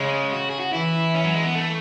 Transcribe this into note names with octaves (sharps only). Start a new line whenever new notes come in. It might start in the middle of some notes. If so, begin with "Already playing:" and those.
Already playing: C#3 G#3
F#4
G#4
F#4
E3 E4
C#4
F#3
G#3
B3
A3